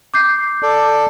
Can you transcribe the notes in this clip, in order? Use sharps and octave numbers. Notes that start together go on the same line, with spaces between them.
D6 G6 C7
A4 D5